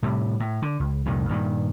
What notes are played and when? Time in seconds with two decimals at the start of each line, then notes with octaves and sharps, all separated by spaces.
0.03 A2 C3 G3
0.40 A2
0.62 D3
0.80 C#2
1.06 C2 F2 A#2 D#3
1.29 G2 A#2 D#3